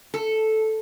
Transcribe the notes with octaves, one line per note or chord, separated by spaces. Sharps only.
A4